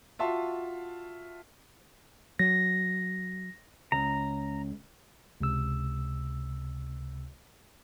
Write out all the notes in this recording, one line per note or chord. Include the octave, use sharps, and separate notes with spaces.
F4 F#4 E5 A5 C6
F#3 A#6
C#2 A#5
C#2 C3 E6